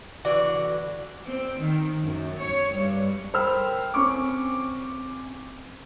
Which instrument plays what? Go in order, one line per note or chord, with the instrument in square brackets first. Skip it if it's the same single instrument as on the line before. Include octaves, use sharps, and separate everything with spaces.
[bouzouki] D3 E3 F#4 D5
[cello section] C4
D#3
F#2
C#5
G2
[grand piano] A#4 C5 G5 B5 E6 F6
C4 C#4 C#6 D6